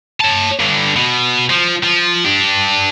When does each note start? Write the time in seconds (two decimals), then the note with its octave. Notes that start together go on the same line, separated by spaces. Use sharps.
0.20 C#5 A5
0.60 G2 D3
0.96 B2
1.50 F3
1.83 F3
2.25 D4 G4